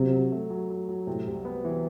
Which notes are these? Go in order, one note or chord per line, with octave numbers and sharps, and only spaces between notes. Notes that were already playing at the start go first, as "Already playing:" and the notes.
Already playing: C3 F#3
F#3
A3
F#3
F#3
F#3
A2 C3
C2
B3
E3